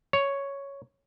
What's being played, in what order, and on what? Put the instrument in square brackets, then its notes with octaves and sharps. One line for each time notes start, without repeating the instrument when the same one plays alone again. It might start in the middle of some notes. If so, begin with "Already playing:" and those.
[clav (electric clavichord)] C#5